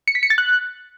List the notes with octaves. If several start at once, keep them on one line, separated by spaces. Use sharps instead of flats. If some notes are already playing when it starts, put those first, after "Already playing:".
C#7
B6
C#7
A6
F#6